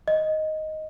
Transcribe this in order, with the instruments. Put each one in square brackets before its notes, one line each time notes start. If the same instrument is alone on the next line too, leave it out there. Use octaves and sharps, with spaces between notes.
[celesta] D#5